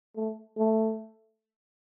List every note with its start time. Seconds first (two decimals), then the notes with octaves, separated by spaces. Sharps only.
0.16 A3
0.58 A3